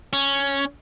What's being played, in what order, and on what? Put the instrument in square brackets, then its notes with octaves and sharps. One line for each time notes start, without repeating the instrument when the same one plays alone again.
[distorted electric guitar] C#4